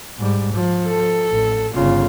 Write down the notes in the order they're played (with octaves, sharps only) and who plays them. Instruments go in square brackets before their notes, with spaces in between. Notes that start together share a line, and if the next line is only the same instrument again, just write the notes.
[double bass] G#2 G3
F3
[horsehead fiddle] A4
[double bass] A1
[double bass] G1 C#3 [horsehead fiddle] F4